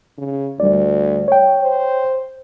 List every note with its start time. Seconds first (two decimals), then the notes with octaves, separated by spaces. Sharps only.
0.18 C#3
0.60 D2 G3 D5
1.28 C#5 G5
1.60 C5